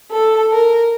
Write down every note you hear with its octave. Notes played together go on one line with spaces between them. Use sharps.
A4
A#4